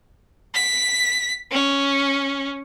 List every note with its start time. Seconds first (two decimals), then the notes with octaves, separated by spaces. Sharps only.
0.55 B6
1.52 C#4